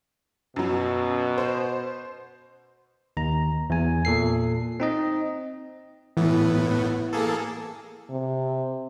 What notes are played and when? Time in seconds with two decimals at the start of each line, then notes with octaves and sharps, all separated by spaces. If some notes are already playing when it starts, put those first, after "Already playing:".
0.56 F#2 B2 F#3
1.38 C5
3.17 D#2 A#5
3.70 E2 G#5
4.05 A#2 A4 C7
4.80 C4 D#4 D#5
6.17 A2 E3 B3
7.13 A#3 G#4 A4
8.10 C3